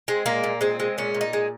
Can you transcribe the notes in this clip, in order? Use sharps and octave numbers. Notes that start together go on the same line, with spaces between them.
G#3 C4
A#2 A#3
A#2
G#3 C4
G#3
A#2 C#4
A#2
D#4
G#3